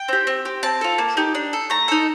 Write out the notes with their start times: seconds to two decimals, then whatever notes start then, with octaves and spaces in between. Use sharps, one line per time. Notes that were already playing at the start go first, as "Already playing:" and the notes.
Already playing: G5
0.08 C4 G4
0.27 C4
0.45 G4
0.63 C4 A5
0.81 F4 A4
0.98 A#3
1.17 D#4 G4
1.35 D4
1.53 A4
1.70 A3 A#5
1.88 D#4 A4